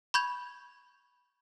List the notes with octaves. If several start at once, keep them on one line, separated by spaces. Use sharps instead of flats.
B5 C#6 G6 G#6 F7